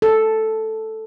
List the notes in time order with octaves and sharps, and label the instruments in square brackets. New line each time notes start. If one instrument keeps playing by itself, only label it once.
[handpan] A4